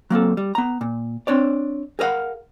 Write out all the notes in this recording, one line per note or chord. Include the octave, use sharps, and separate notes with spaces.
F#3 A#3 C4 A4
G3
B3 A#5
A#2
C4 D4 C#5 D5
G#4 A#4 B4 F5 F#5